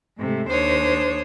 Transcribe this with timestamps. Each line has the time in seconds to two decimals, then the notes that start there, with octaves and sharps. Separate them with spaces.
0.17 G#2 C3 A3
0.49 D#2 D4 C5 C#5 D#6